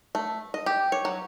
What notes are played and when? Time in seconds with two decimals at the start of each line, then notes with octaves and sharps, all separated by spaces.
0.15 A3
0.54 D#5
0.66 G4
0.92 C#5
1.05 F#3